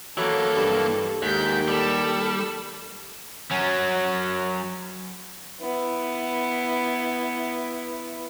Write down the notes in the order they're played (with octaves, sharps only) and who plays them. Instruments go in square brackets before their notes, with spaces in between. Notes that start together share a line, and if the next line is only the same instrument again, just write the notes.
[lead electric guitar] E3 A#3 [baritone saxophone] F#3 [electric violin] A4
[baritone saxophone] G2
[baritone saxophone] D#2 [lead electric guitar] G#2 [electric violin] G6 B6
[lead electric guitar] G3 [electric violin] A4 E6
[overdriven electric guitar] F#3 C#4
[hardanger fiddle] B3 E4